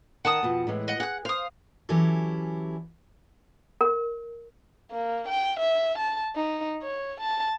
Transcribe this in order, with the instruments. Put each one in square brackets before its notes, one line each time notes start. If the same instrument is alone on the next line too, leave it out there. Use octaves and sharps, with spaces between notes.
[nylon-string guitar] D#3 [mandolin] F#5 A5 D#6
[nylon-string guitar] F2 B2
A2 E3 G#3
[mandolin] D#5 F#5
[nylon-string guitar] G#4 [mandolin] F#5 F#6
[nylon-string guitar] C5 [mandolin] F5 D#6
[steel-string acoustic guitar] E3 F#3 C#4 E4 G4 A4
[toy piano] A#4
[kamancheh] A#3
G5
E5
A5
D#4
C#5
A5